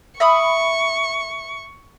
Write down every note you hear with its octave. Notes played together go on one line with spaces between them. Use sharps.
E5 B5 C#6 D#6